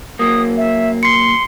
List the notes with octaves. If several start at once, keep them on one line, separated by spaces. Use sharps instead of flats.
F#3 A#3 D#6
E5
C6 C7 C#7